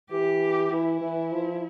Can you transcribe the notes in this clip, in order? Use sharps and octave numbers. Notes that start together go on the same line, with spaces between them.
E3 G4
E3 E4
E3
F3